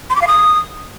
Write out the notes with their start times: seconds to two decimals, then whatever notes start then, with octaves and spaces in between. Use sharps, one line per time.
0.10 C6
0.16 D6
0.22 F5
0.27 D#6